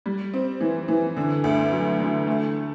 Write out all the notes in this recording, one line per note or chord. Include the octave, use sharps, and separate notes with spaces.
G3
C4
E3
E3
D3
D2
F#3
D3
A3